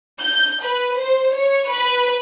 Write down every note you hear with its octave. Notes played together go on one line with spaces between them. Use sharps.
G6
B4
C5
C#5
B4